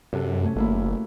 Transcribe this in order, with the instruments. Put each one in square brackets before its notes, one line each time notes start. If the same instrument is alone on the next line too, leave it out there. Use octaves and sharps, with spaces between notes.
[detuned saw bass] F#2 [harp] C3 F#4 A4
[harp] A3 C#4
[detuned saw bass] G#1 [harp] A3 A#3 E4
[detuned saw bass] F#1